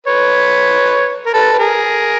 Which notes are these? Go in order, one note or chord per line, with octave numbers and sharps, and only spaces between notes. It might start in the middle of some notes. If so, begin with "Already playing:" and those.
B4 C#5
A#4
A4 B4
B4
G#4 A#4